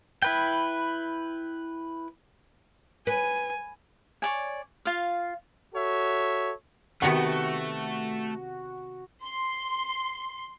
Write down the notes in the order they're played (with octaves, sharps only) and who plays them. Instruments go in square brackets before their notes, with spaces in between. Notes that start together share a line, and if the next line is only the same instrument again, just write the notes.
[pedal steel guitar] E4 B4 G5
[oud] B4 [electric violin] G#5
[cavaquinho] C#5 D5 G#5
F4 F5
[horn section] F#4 A4 C#5 E5
[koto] C3 D#3 B3 [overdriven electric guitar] A3 [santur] F#4 C#6 [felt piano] F#5
[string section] C6